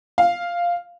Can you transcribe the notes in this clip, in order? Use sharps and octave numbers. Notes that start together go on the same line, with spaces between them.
F5